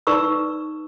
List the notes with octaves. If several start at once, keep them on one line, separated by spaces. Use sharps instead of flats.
D#4 B4 D5 C#6 E6